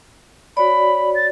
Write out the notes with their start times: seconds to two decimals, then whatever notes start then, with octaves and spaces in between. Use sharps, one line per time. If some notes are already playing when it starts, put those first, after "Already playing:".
0.57 F#4 C#5 D5 B5
1.15 A6